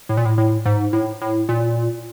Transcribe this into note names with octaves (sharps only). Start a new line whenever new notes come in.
A2
A#2
A2
A2
G#2
A2
A2
A#2